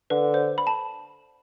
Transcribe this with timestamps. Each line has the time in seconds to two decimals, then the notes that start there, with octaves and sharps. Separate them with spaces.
0.10 D3 B4
0.34 C5
0.58 B5
0.67 A5